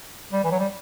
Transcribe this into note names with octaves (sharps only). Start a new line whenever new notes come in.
G3
E3
F#3
G3